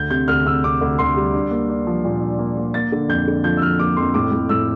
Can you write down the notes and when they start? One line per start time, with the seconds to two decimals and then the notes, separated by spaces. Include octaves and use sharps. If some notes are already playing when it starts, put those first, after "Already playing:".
Already playing: D2 G6
0.10 C3 G6
0.28 D2 F6
0.46 C3 E6
0.64 C3 D6
0.81 D2
0.99 D2 C6
1.16 G3
1.34 D4
1.51 A#3
1.69 D4
1.87 F3
2.04 A#2
2.21 D4
2.38 A#3
2.57 A#3
2.74 A#3 A6
2.92 D3
3.09 F2 G6
3.27 D3
3.44 F3 G6
3.57 E6
3.62 F3 F6
3.79 A#3 D6
3.96 F2 C6
4.14 A2 D6
4.32 A2
4.49 A2 E6